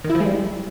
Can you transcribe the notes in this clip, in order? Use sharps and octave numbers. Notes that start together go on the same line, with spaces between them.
D#3
E4
F3
G#3
G3